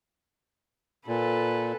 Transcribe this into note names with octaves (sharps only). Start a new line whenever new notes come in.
A#2 A4 B4